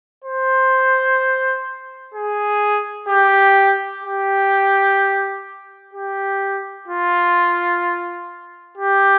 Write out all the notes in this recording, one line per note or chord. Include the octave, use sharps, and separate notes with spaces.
C5
G#4
G4
G4
G4
F4
G4